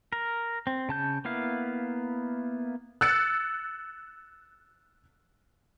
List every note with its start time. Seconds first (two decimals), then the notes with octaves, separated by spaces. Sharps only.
0.13 A#4
0.67 C4
0.89 C#3 A5 G6
1.25 A#3 B3 E4 F5
3.01 E6 F#6 A6 C#7